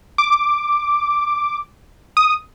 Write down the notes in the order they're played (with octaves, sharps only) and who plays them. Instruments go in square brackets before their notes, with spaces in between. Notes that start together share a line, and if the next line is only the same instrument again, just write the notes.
[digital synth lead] D6
D#6